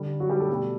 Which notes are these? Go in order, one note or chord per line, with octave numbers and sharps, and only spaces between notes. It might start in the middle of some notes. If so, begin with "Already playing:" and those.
Already playing: D3 G3
F#3 F#4
G3 G4
A3 A4
B2 G3